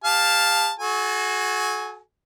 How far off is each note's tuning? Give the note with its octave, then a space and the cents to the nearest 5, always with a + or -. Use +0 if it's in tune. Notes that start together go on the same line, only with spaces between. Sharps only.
G4 +40 F5 +5 A5 +0
F#4 +0 A4 -40 G#5 +0